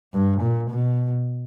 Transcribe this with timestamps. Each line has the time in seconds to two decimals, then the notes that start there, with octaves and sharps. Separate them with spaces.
0.14 G2
0.41 A#2
0.70 B2